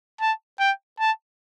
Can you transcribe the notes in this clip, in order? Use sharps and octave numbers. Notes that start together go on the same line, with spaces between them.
A5
G5
A5